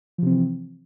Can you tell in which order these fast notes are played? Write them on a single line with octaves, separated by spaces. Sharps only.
F3 C3 C4 E3